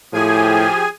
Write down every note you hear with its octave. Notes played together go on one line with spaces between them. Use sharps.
A2 F3 G4 G#4 G#5